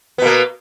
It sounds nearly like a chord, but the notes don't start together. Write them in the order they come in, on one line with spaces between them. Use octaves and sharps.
B3 B2 A#3